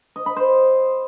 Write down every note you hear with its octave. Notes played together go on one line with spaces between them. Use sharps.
D#5
B5
C5